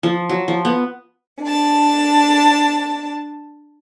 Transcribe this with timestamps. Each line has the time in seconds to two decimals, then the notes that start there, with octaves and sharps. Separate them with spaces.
0.03 F3
0.29 F#3
0.48 F3
0.65 B3
1.43 D4 A5